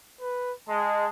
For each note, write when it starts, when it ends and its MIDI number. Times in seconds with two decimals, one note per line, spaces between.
0.21 0.52 71
0.69 1.07 56
0.69 1.09 81